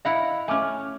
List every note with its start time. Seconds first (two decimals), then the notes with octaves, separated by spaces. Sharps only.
0.05 E4 D#5 F5 F#5 A#5 B5
0.48 A3 C#4 G#5 D6 F6